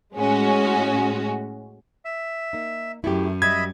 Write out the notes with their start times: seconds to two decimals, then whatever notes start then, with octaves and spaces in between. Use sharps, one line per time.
0.16 A2 G#3 C#4 F#4
2.05 E5
2.53 A#3 D#4
3.04 F#2 A3 E4 G4
3.42 G3 D#5 E5 B5 G#6